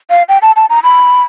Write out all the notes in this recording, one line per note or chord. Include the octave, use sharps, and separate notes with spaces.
F5
G5
A5
A5
A#5
B5